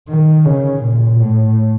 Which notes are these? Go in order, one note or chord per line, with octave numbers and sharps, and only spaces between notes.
D#3
C#3
A#2
A2